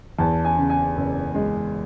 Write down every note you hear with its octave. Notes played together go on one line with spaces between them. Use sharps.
E2 A5
G#5
C#3
G#5
F#1
G#3